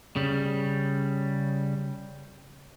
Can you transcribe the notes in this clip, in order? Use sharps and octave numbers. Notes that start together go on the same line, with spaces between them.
C#3 G3